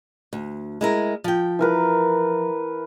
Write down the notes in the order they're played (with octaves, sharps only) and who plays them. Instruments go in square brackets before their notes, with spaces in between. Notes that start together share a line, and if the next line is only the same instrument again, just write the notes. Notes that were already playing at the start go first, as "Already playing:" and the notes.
[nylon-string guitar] D2
G#3 E4 A#4
F3 G5
[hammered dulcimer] E3 A#4 B4